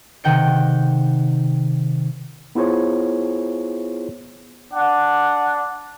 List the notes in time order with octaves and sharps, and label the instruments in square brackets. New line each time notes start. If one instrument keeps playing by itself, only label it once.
[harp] C3 D#3 F#5 G5 G6 C#7
[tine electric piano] B3 E4 F4 G#4 C5 C#5
[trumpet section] D4 F#5